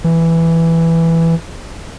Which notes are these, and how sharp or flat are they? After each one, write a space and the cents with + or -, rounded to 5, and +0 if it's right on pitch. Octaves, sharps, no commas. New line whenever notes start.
E3 +5